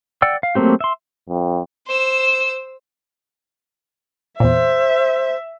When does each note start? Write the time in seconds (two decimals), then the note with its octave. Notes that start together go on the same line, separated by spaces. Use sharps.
0.22 D5 F#5 G5 E6
0.43 F5
0.55 F#3 A3 A#3 C4 G4
0.81 E5 C6
1.29 F2
1.87 C5 E6
4.40 E2 A#2 C5 E5